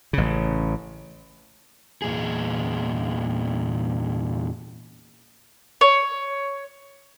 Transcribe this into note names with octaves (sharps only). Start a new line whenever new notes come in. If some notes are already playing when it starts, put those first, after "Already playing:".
A1 C#3
E2 A#2 G#4
C#5